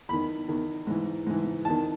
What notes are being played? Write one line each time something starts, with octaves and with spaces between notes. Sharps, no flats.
E2 D#3 B5
E2 D#3
G#2 E3
G#2 E3
E2 D#3 A5